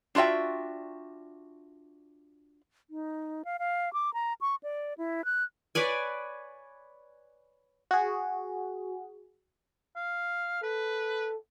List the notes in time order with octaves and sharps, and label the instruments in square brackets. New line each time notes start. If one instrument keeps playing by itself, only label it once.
[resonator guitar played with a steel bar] D4 F4 F#4 E5 G5
[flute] D#4
F5
F5
D6
A#5
C#6
D5
E4
F#6
[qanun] B4 C#5 D5 G#5
[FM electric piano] F#4 G#4
[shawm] F5
[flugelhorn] A4 [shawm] B4